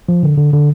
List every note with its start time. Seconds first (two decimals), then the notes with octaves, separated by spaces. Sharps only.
0.09 F3
0.23 D3
0.38 D3
0.53 D3